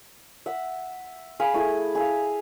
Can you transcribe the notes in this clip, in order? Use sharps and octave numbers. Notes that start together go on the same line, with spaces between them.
E5 F#5
G#4 F5 G#5 B5
A3 E4 G#4
G#4 E5 F5